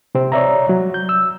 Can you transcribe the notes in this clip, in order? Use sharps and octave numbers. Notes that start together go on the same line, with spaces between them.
C3 C4
C#5 D5 E5 A#5
F#3
G6
E6